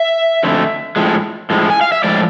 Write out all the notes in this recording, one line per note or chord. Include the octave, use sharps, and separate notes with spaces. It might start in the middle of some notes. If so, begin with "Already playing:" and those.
Already playing: E5
F2 D3 A3
A2 F3 G#3
A2 F3 G#3
G#5
F5
E5
A2 F3 G#3 D5